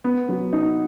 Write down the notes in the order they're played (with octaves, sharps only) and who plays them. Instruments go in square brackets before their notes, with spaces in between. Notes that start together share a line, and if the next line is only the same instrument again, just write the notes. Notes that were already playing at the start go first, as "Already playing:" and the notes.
[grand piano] B3
F#3
D#4